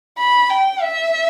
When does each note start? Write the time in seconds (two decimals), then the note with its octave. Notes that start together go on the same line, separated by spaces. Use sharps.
0.18 B5
0.50 G5
0.82 E5